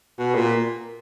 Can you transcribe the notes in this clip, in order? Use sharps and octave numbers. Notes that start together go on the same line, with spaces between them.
B2
A#2